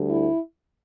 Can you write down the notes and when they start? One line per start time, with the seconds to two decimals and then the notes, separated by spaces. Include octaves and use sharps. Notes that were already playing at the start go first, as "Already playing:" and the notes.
Already playing: D2 D3 G3
0.10 E4